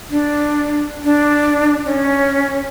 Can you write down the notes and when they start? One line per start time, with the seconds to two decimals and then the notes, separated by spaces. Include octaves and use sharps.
0.11 D4
1.04 D4
1.85 C#4